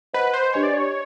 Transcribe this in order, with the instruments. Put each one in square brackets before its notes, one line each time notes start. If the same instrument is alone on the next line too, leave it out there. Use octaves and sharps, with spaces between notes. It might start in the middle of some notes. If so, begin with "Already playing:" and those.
[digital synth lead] B4 [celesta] C5 D#5 F#5 B5
[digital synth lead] C5
[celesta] D4 G4 B4 D#5 G#5 [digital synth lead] C#5
[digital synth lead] D5
C#5